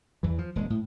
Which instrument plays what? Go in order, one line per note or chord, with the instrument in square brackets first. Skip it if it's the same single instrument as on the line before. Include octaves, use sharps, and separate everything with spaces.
[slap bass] E2 E3
F3
D#1 G#3
A2